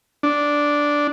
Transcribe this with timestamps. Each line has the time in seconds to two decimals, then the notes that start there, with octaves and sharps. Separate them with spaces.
0.23 D4